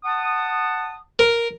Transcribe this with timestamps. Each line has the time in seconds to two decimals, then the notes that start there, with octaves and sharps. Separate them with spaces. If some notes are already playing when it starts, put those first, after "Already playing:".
0.04 F#5 A5 D#6
1.19 A#4